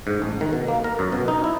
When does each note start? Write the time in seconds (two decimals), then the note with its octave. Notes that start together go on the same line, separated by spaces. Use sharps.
0.07 G#2
0.22 A1
0.41 D#3
0.53 B2
0.68 A#3
0.84 A#4
0.99 F#2
1.12 B2
1.28 D#4
1.44 E4